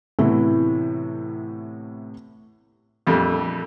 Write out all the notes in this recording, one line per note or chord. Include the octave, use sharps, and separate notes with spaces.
A2 C3 E3 A3 B3 E4
A#1 F2 G3 A3